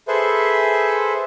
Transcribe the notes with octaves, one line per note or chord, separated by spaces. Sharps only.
G#4 A4 B4 C5 E5